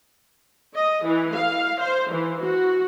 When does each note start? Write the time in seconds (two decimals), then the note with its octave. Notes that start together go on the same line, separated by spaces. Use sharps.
0.75 D#5
1.03 E3
1.35 F5
1.79 C5
2.11 E3
2.42 F#4